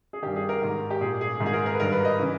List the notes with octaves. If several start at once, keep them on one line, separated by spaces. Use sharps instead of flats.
G#4
G2 D#3 G4
G#4
A#4
G#2 D#3
G4
A#2 G#4
G#4
G#2 D#3
G#4
A#4
A#4
B4
G2 D#3 A#4
B4
D#5
C#3 E3